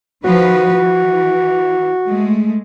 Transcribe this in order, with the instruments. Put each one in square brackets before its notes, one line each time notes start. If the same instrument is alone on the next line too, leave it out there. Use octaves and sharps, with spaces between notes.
[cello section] D#3 F3 B4 [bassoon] F#4
[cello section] E3
G#3 A3